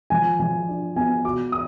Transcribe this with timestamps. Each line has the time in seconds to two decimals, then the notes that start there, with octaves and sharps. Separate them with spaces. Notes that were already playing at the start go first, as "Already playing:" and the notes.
0.10 F3 G#5
0.39 F3 G#5
0.68 D4
0.96 B3 G#5
1.25 B2 D6
1.52 D#6